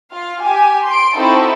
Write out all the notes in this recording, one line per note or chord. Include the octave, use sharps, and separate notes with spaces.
F4 F5
G4 G#5
C6 D7
C4 D#4 E4 F#4 A4